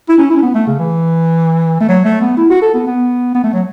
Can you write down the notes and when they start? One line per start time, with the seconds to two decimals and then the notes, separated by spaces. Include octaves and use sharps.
0.09 E4
0.18 C#4
0.30 E4
0.37 C#4
0.42 B3
0.54 A3
0.67 C#3
0.79 E3
1.80 A3
1.89 F#3
2.05 A3
2.21 B3
2.37 E4
2.50 F#4
2.62 A4
2.74 B3
2.86 B3
3.35 B3
3.44 A3
3.53 F#3